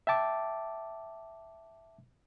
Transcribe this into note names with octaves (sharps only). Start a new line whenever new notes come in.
E5 G5 A5 D6